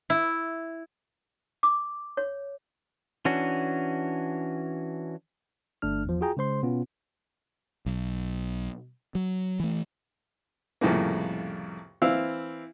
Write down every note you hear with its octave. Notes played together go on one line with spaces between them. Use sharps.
E4
D6
C#5
E3 C#4 D4 F#4
G1 A3 D4 F6
E2 F3
F4 F#4 G#4 G5 A#5
C#3 G#3 C5 C6
B2 B3 C#4 F4
B1
F#3
E3 A3
C2 F2 A2 C#3 A#3
E3 C4 E4 F5 E6